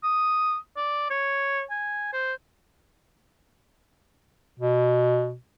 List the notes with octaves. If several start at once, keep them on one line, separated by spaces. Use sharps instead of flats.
D#6
D5
C#5
G#5
C5
B2